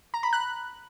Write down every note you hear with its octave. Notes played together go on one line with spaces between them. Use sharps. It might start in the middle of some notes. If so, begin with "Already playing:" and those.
A#5
B5
F#6